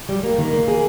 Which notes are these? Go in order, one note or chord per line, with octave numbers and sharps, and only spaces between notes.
G3
A#3
D#3
A#3
G#4